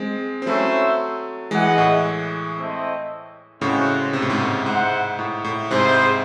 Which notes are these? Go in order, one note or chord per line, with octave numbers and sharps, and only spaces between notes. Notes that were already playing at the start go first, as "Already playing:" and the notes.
Already playing: G#3 C4
C4
F#3 A3 C#4 E4 C5 E5
E3 G#3 E4 G#4 D#5 F#5
A2
A3 C4 E4 C5 D#5
A2 C#3 G#3 C4 F#4 C5 F#5
C3
A2
G#2
A2
G#2 E4 C5 F#5
A2
A2
G#2 C3 E4 G#4 C5